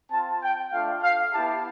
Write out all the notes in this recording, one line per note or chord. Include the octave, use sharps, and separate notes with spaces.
C4 F4 A5
G5
A3 D4 F4 F5
F5
B3 E4 G4 A5